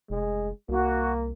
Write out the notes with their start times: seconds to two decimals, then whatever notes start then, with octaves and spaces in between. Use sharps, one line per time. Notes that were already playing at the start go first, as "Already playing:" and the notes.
0.10 F1 G#3
0.69 C2 A#3 F#4